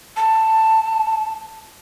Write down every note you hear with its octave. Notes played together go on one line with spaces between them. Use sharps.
A5